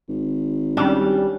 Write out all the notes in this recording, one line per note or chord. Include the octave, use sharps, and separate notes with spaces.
G#1
G3 C#4 D4